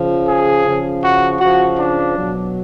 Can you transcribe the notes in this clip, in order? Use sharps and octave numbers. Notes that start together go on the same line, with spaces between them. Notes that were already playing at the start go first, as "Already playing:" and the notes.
Already playing: C#3 F3
G#4
C#3 F3
F#4
C#3 F3 F#4
D4
B2 F#3